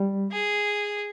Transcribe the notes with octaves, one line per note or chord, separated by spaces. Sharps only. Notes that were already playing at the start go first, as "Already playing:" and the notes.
Already playing: G3
G#4